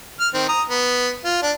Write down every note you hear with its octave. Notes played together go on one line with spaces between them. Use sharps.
F6
D#3 C4
A#5 D#6
B3
F4
D4